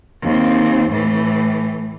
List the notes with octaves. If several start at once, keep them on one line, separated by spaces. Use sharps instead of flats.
D#2 C4
A2 E3